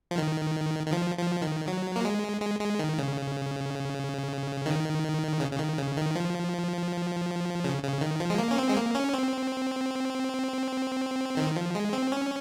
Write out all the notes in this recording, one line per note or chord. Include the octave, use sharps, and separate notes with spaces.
F3
D#3
D#3
F3
F3
D#3
F#3
A#3
G#3
G#3
G#3
D#3
C#3
D#3
C#3
C#3
D#3
C#3
D#3
F3
C#3
C#3
D#3
F3
G#3
A#3
C#4
C4
G#3
A#3
C#4
C4
D#3
F3
G#3
C4
C#4